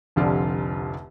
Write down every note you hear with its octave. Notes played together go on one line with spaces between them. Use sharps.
F1 C2 D3 F3 F4 D5